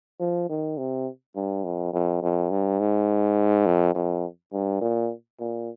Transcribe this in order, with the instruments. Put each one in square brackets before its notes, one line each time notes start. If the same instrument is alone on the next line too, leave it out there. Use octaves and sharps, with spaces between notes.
[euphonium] F3
D#3
C3
G2
F2
F2
F2
G2
G#2
F2
F2
G2
A#2
A#2